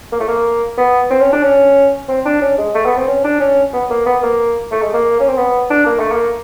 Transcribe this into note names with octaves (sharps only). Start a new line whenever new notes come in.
A#3
A3
A#3
B3
C4
C#4
D4
C#4
C4
D4
C#4
G#3
A3
B3
C4
C#4
D4
C#4
B3
A#3
B3
A#3
A3
G#3
A#3
C#4
C4
B3
D4
A#3
A3
A#3